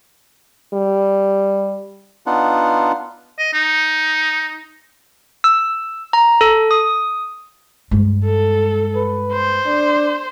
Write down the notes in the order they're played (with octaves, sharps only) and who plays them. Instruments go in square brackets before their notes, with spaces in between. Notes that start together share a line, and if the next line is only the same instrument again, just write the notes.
[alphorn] G3
[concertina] B3 D4 D#4 F4 F#5
[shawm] D#5
D#4
[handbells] E6
A#5
A4
D#6
[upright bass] G2 G#3
[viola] A4
[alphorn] B4
[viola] C5
[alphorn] D4